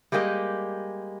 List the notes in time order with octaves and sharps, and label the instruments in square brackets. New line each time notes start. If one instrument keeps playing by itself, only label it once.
[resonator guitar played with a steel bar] G3 G#3 A#3 G4 D#5